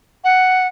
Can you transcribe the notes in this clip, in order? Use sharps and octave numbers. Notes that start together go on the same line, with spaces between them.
F#5